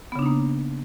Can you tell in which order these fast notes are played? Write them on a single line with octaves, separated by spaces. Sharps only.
B3 C#3 D4 D#4 A#3